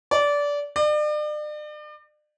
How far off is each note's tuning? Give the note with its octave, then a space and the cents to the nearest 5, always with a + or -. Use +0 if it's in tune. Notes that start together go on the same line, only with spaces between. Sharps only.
D5 -20
D5 +40